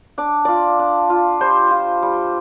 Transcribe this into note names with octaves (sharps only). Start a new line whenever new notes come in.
D4 D6
F4 D5 D6
D4
F4
G3 C5 C6
F4
G3